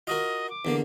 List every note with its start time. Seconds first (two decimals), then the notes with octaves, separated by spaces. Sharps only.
0.07 F4 F#4 A#4 D#5
0.50 D6
0.65 E2 D3 A#3